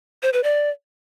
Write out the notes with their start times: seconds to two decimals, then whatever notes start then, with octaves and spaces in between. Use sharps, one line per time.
0.23 C5
0.33 B4
0.44 D5